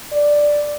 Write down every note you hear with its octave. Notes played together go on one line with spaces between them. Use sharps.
D5